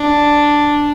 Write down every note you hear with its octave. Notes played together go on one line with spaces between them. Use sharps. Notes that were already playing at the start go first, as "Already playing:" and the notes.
Already playing: D4